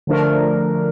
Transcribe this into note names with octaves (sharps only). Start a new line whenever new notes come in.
D3 F3 A3 D4 A#4